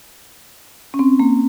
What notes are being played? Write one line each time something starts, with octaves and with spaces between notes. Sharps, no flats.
C#4
C4
A#3